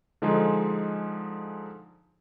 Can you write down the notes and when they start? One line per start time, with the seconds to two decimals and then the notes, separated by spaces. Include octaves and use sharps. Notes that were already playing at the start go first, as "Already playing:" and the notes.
0.22 D3 F3 G#3 D#4 G#4